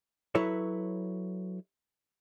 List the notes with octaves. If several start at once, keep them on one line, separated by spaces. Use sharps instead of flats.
F#3 E4 A4 B4 C#5